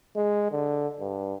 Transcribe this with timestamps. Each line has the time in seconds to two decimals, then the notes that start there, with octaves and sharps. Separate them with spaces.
0.16 G#3
0.52 D3
1.00 G2